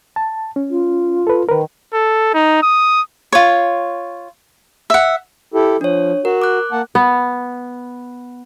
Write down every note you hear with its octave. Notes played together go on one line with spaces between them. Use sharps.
A5
C#4
F4
A4 B4
D#3 A#4 B4
A4
D#4
D#6
F4 C#5
E5 F#5
E4 G4 A4
F3 D4 C#5
F#4 A#4
D6 F#6
A#3 F#5 A5
B3